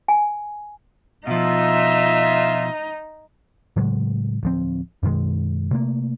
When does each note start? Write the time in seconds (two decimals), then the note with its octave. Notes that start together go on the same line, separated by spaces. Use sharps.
0.08 G#5
1.27 B2 F3 D#4 F4 E5
3.76 A2 C#3 F#3 G#3
4.43 D1 F3 C4
5.03 F#2 B2 D#3 G#3
5.71 C3 A3 A#3